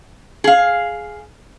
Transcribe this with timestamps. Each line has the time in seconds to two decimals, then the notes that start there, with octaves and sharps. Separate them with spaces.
0.44 G#4 F5